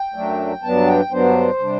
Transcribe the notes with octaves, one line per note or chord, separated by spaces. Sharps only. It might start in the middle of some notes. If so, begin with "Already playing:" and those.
Already playing: G5
F#2 F#3 A3 D4
G2 F#3 B3 D4 A5
G5
G2 F#3 B3 D4 C5
C3 G3 D4